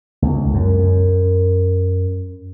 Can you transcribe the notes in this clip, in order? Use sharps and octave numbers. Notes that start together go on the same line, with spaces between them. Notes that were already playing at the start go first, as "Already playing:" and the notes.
C#2
F#2